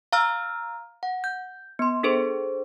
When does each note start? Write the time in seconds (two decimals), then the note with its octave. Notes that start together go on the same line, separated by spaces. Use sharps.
0.13 F5 A#5 E6 F6
1.03 F#5
1.24 G6
1.79 B3 C6
2.03 D4 G#4 A4 C5